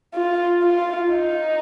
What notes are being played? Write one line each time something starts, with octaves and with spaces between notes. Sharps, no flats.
F4
F4
D#4